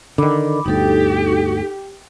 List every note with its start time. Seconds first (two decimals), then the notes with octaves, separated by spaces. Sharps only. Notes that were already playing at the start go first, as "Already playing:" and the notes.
0.18 D3 D#3 B5 D6
0.66 G1 D2 D#4 G4 A4